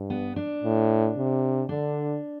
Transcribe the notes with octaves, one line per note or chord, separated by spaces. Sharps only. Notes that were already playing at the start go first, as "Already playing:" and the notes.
Already playing: G2
B3
D4
A2
C3
D3 D4